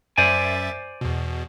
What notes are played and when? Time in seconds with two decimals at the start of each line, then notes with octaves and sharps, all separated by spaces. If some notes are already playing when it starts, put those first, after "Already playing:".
0.17 F#2 C5 D5 E5 G#5 A6
1.01 E2 B2